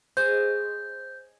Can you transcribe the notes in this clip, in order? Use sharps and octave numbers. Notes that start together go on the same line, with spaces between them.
G#4 C5 C#5 D#5 G6